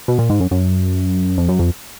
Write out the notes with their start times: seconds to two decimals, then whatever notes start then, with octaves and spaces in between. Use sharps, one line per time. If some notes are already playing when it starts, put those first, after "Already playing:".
0.08 B2
0.19 A#2
0.30 G#2
0.40 F#2
0.51 F#2
1.38 F2
1.48 F#2
1.59 F2